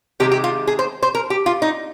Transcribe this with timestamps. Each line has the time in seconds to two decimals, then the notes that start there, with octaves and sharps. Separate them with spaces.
0.20 C3 D#3 G#3 G4
0.32 G4
0.44 F4
0.67 G#4
0.79 C5
1.03 C5
1.15 A#4
1.30 G4
1.46 F4
1.62 D#4